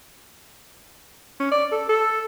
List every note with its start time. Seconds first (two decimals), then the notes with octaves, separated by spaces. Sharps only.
1.40 C#4
1.51 D5
1.72 A4
1.89 A4